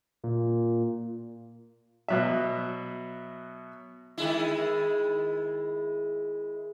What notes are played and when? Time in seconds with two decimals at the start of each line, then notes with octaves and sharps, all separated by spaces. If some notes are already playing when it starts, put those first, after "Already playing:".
0.24 A#2
2.08 B2 F#3 E5
4.18 D#3 G#3 E4